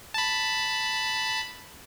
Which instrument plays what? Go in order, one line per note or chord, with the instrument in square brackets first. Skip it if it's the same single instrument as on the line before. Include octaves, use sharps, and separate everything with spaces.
[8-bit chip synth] A5 B5